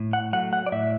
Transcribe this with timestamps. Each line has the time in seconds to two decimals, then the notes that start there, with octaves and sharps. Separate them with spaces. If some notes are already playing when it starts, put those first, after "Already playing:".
Already playing: A2
0.13 F#5
0.33 F#3 A3 F#5
0.53 F#5
0.66 D5
0.72 A2 E5